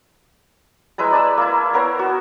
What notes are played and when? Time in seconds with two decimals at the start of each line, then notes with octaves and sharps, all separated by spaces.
0.98 G#3 E4 B4 A#5
1.12 D5 A5 E6
1.38 A#3 E4
1.74 B3 A#4 C#5 F5
1.99 F#4